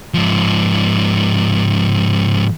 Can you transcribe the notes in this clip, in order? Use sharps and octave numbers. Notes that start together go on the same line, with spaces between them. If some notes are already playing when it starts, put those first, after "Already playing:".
G#2 F3